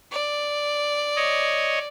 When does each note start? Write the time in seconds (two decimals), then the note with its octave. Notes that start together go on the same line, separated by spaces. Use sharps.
0.12 D5
1.16 C#5 D#5